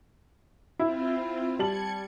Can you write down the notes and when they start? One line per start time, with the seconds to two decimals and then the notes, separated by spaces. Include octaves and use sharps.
0.79 C4 E4 F4 E5
1.59 G3 A5 G#6 C#7 F#7